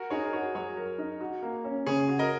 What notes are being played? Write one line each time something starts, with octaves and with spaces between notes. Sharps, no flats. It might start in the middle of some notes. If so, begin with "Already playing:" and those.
Already playing: F#4 A#4
D#4 G#4 C#5
A#4
F#4 G#4 C#5
F#3 G#4 C#5
A#4
D#4
F#4
A#3
C#4
C#3 G#4 C#5
F#4
A#4 D#5